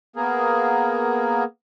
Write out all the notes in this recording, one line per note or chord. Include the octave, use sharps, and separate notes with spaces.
A#3 B3 G#4 A#4